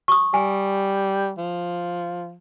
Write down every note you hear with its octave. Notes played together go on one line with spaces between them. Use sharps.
C#6 D#6
G3 G#5
F3